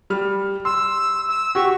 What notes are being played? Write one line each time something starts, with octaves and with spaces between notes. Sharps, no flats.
G3 F6
C6 E6
E6
F#4 G4 C#6